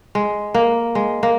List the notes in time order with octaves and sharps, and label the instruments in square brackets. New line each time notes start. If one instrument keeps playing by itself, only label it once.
[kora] G#3
A#3
G#3
A#3